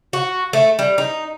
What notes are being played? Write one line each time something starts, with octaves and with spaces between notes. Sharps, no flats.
F#4
A3
G3
D#4